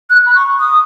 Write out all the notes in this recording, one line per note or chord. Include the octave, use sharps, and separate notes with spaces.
F#6
B5
C#6
D#6